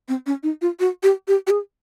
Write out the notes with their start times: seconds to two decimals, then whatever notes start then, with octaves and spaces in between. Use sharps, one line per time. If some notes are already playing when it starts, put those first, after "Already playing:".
0.09 C4
0.26 C#4
0.43 D#4
0.62 F4
0.80 F#4
1.03 G4
1.28 G4
1.47 G4
1.50 G#4